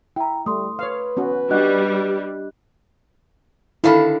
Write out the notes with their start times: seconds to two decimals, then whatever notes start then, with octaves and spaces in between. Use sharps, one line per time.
0.16 E4 G5 A#5
0.46 G3 A3 C6 D#6
0.79 B4 C#5 F5
1.17 B3 C#4 F#4
1.51 G3 D4 F#4 D#5 F#6
3.84 D3 D#3 D4 E4 F5 B5